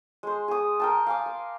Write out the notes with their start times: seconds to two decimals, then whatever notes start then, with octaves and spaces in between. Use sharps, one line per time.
0.23 G#3 C5
0.48 G#4 D#6
0.80 A#4 G5 A5
1.07 F5 G#5 D6
1.26 C5